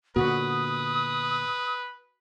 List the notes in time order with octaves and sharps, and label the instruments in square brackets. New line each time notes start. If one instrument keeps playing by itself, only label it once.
[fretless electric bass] A#2 D3 B3 [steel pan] F#4 [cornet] B4 [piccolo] D#6